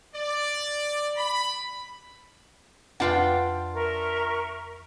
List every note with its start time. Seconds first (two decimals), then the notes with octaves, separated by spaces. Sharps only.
0.16 D5
1.18 B5
3.00 F2 D4 F4 B4 F#5 G5
3.74 A#4 E5 C#6